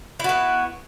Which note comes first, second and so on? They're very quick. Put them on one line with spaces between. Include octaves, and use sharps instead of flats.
E4 F#4 B3